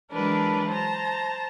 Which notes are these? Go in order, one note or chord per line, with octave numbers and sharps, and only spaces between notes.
E3 F#3 G#3 D4 A#4 B4
C5 A5 A#5